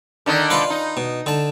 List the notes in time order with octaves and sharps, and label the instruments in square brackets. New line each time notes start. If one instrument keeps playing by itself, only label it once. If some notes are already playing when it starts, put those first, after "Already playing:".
[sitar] D3 D#3 D#4
[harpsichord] F4 B4 F5
[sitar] D#4
[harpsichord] B2
D3 A5